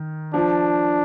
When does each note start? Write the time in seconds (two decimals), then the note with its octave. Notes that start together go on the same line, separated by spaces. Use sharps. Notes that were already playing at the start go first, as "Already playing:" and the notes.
Already playing: D#3
0.34 F3 D4